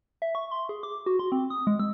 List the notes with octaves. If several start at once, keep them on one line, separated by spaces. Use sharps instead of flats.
E5
C#6
C6
G#4
D6
F#4
C6
C4
D#6
G#3
E6